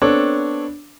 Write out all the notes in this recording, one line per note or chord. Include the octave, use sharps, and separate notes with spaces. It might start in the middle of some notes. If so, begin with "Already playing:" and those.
B3 C4 D4 A4 C#5